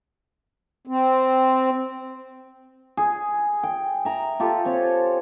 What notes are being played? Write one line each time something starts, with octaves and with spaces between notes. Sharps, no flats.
C4
G#4
G5
E5 A#5
F4 G4 A4
C4 C#5